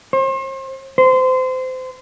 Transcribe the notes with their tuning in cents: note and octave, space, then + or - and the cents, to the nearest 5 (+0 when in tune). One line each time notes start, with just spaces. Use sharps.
C5 +40
C5 -25